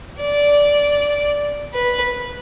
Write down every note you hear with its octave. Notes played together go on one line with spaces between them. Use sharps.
D5
B4